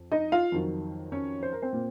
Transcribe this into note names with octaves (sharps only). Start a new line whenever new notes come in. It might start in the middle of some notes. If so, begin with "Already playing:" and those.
Already playing: F2
D#4 D#5
F4 F5
F2 D#3 F#3
C#4 C#5
C5
A#4
C4 C5
A#2